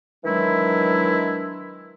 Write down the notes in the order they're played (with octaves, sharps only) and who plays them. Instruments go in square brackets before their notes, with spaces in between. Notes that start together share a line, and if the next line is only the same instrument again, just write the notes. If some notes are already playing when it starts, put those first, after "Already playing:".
[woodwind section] D#3 E3 F#3 G#3 D4 E4